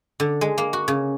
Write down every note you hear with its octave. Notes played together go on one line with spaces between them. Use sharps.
D3
G#3
A#3
F#4
C#3